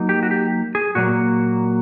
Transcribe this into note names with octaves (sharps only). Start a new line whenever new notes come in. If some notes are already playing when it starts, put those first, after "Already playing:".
Already playing: F#3 A#3 D#4
G4
F#4
G4
G#4
A#2 F#3 A#3 F#4